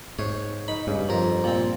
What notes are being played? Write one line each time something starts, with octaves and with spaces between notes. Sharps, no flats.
G#2 C#5
D#4 B5
G2 C#3
F2 A#4 C5
A#2 C4